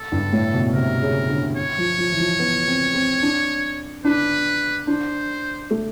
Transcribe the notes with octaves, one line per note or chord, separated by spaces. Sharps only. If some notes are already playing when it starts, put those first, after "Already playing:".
Already playing: A4
G2
A2
B2
C3 A#4
C#3
D3
C#5
F3
F3
E3
F3
B3
C4
C4
D4
D4 B4
D4 C5
A3